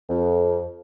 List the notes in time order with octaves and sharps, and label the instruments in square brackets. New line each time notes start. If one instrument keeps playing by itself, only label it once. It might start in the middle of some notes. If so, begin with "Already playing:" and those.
[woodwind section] F2